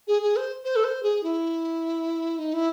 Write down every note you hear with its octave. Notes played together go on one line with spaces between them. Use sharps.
G#4
G#4
C5
C5
A4
C5
G#4
E4
D#4
E4